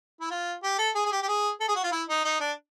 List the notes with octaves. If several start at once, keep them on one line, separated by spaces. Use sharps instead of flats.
E4
F4
G4
A4
G#4
G#4
G4
G4
G#4
A4
G#4
F#4
F4
E4
D#4
D#4
D4